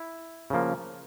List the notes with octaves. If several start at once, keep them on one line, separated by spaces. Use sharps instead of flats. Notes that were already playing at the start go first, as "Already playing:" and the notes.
Already playing: E4
C#3 F3 A#3